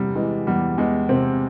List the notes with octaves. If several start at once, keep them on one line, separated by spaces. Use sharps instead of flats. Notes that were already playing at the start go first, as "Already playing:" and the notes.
Already playing: E2 C3 G3
E3 G#3
E2 G3
E2 G#3
C3 C4